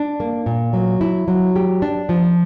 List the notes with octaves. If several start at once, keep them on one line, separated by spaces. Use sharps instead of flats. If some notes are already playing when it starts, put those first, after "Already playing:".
Already playing: D4
A#3
A#2
F#3
E4
F#3
G4
D4
F3